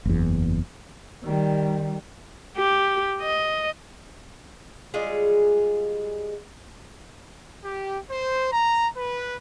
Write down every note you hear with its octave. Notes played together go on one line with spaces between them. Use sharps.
F#1 E2
D#3 G3
G4
D#5
G3 G#3 F4 G#4
G4
C5
A#5
B4